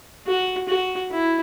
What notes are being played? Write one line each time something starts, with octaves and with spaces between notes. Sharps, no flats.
F#4
F#4
E4